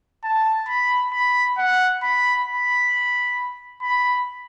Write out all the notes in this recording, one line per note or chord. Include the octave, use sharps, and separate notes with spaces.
A5
B5
B5
F#5
B5
B5
B5